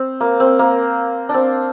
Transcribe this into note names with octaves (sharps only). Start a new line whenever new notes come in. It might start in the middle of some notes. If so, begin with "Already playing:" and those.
Already playing: C4
A#3
C4
A#3
D4
C4